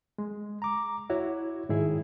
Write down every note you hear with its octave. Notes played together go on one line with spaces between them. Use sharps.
G#3
A#5 D6
E4 F#4 C#5
G#2 D#3 E4 G#4